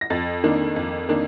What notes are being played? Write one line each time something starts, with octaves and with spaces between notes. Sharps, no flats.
A#6
F2 A6
D#3 A#3 D4
F2
D#3 A#3 D4